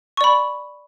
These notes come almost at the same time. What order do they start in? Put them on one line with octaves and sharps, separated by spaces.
C#6 D5 B5